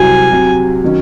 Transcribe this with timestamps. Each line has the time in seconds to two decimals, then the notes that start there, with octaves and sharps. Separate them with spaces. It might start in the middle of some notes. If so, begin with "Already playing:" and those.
Already playing: C2 C3 F#3 C4 F#4 G#5
0.31 C3 F#3 C4 F#4
0.84 D#3 F#3 C#4